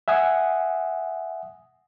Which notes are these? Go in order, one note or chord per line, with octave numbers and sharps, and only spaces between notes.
E5 F#5 G#5 D#6